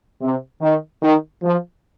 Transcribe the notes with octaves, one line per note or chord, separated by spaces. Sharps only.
C3
D#3
D#3
F3